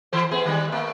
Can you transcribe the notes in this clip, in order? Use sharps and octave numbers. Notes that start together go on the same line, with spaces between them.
E3 A4 C5
A3 B3 G#4
D#3 G3 G#3
A3 A#3